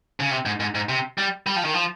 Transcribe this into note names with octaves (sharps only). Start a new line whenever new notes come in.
C#3
C3
G#2
G#2
G#2
C3
G3
G3
F3
D#3
F3